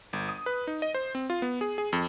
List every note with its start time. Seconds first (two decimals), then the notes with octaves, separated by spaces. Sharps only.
0.13 G1
0.29 D#6
0.46 B4
0.67 D#4
0.82 D#5
0.94 C5
1.15 C4
1.30 F4
1.42 B3
1.61 G#4
1.78 G#4
1.93 F2